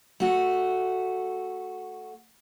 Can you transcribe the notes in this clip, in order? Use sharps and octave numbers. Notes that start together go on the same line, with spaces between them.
A3 F#4